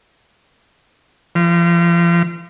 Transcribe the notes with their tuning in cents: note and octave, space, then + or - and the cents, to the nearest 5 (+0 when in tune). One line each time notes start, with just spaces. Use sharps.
F3 -35